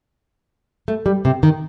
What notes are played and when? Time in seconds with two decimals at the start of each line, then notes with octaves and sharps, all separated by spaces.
0.88 A3
1.06 G3
1.25 C3
1.43 D#3